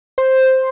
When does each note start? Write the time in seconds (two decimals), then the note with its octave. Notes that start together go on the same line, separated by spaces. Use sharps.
0.18 C5